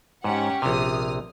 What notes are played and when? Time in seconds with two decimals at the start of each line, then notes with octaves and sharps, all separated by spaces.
0.24 G#2 C#4 G4 F#5
0.62 A#1 C3 D#6 F6